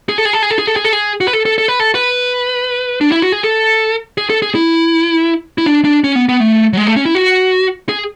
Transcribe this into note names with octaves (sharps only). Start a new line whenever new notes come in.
G#4
A4
G#4
A4
G#4
A4
G#4
A4
G#4
A4
G#4
F#4
B4
A4
A4
A4
B4
A4
B4
D4
E4
F#4
G#4
A4
G#4
A4
G#4
E4
E4
D4
D4
C#4
B3
B3
A3
F#3
G#3
A3
C#4
E4
F#4
G#4